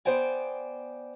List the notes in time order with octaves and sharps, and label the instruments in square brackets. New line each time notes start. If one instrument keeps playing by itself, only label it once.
[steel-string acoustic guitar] B3 C5 D5 G5 G#5